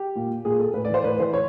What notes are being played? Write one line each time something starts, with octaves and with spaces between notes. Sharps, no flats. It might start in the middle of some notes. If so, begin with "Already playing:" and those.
Already playing: G4
A#2
A#2 G#4
A4
A2 B4
D5
E3 C5
A2 B4
E3 C5
C#5